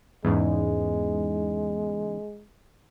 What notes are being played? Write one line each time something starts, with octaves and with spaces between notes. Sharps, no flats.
E2 G#2 C#3 G#3